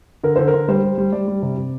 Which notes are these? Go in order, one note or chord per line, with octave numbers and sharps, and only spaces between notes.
D3 A#4
D3 C5
A#4
D3
G3 C5
G3
G3
G3 D5
G3
C3
C3